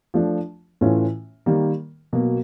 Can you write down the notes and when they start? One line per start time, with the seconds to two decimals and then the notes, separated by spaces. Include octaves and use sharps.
0.14 F3 A3 D4
0.81 A2 E3 A3 C#4 F4
1.46 D#3 G3 A#3
2.13 B2 F#3 A#3